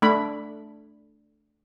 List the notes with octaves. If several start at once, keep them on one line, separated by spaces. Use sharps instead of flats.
A3 D4 B5